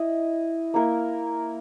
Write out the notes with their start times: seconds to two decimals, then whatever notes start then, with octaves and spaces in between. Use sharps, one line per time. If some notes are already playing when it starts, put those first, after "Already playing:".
Already playing: E4 D#5
0.74 A#3 E4 A#4